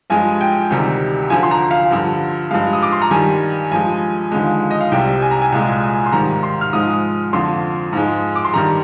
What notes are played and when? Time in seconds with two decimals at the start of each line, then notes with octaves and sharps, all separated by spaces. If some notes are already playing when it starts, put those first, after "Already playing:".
0.10 G2 F3 G#3 G#5
0.41 G5
0.70 D2 C3 D#3 G3
1.30 D2 D3 F3 G#5
1.43 C6
1.51 A#5
1.71 F5
1.91 G2 D3 F3
2.51 G2 F3 G#3 F5
2.73 D#6
2.82 D6
2.93 C6
3.02 A#5
3.11 G2 D#3 G3 G#5
3.71 G2 F3 G#3 G#5
4.32 D#2 D3 F3 G#3
4.71 D#5
4.81 F5
4.92 C2 C3 G3 G5
5.22 G#5
5.31 A#5
5.42 G#5
5.52 C2 A#2 G#3
6.06 C6
6.12 G#2 D#3 G3 A#5
6.43 C6
6.61 F6
6.73 G#2 F3 G#3 D#6
7.33 F2 D3 F3 C6
7.93 G#2 F3 G#3
8.36 D6
8.45 C6
8.53 G2 D#3 G3 A#5